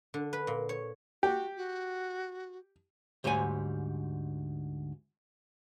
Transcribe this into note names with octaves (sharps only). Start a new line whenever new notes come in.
D3
B4
A#2
C#5
F#4 G4
F#4
D2 G#2 G3 C#5 G#5